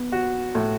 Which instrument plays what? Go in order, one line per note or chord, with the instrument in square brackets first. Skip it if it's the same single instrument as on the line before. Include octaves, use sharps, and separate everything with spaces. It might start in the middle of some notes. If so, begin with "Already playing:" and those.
Already playing: [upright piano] B3
F#4
A2